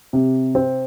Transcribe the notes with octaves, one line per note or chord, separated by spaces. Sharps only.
C3
C4